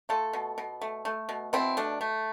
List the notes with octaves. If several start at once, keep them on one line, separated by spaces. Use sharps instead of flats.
A3 F4 A4
B2
B2
A3
A3
B2
B2 C4 E4
A3 D4
A3